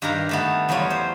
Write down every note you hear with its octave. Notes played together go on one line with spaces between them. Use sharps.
G2 D#3 G4 A#4 F5 A#5
D#3 A3 B3
E2 F#3 G3 F4 C#5 B5
C5